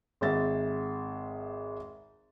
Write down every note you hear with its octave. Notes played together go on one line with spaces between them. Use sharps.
G#1 G#3 E5 A6